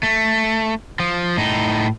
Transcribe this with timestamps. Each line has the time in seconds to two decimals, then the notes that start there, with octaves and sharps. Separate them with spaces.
0.03 A3
1.00 F3
1.37 A2 D#4